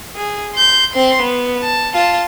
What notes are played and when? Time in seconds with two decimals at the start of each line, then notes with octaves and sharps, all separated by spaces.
0.16 G#4
0.54 C6 G6
0.92 C4 C6
1.21 B3
1.63 A5
1.94 F4 A5